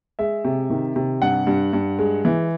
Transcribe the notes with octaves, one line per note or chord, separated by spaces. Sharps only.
G#3 E5
C3
D#3
C3
G2 F#5
G2
G2
G#3
E3